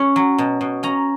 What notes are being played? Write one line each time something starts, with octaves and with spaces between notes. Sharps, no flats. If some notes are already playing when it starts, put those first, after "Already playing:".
Already playing: C#4
F#3
B2
B2
C#4 A#5